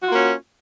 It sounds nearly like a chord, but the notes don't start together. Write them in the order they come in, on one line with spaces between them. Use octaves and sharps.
F#4 F4 A#3 C#4